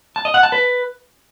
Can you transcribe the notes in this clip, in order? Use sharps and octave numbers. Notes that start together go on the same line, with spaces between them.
A5
D#5
F#5
A5
B4